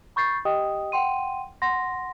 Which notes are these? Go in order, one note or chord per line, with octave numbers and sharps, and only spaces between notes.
B5 C#6 G6 A6 C7
G4 D#5 G5 D#6
F#5 G5 C6 D#7
F#5 C6 A#6